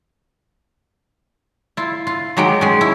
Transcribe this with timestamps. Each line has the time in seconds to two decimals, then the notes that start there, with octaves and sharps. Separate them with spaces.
1.77 E4 F4
2.07 F4
2.37 D#3 F#3 G#3 G4 G5
2.61 G#3 C#4
2.81 E4